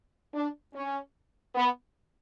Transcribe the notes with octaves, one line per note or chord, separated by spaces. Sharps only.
D4
C#4
B3